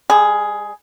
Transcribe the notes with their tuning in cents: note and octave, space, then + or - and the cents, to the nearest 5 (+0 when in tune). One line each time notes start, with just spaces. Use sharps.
G3 +45 G#4 +10